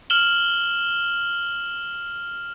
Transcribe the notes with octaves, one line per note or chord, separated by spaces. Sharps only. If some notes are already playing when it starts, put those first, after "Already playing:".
F6 E7 F#7 G7